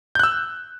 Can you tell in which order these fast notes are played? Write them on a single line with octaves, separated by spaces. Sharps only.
G6 F#6 E6